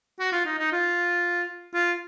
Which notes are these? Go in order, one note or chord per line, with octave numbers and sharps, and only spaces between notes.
F#4
F4
D#4
D#4
F4
F4